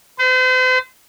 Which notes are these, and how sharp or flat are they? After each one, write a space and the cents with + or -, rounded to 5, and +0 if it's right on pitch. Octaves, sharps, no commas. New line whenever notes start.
C5 -40